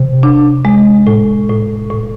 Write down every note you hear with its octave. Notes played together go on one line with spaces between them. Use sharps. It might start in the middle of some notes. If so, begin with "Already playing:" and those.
Already playing: C3
D4
G#3
A2
A2
A2